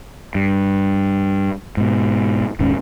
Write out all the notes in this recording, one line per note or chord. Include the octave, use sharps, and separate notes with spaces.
G2
G#2 B2
D#1 D#2 G#2 C#4